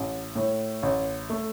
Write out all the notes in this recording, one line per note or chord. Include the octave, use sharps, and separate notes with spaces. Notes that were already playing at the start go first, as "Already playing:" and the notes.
Already playing: A1
A2
A1
A3